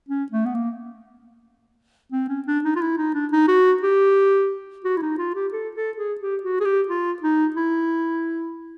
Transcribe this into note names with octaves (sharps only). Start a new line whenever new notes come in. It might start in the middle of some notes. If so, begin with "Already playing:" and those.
C#4
A3
B3
A#3
C4
C#4
D4
D#4
F4
E4
D#4
D4
D#4
F#4
G4
F#4
E4
D#4
F4
G4
A4
A4
G#4
G4
F#4
G#4
G4
F4
D#4
E4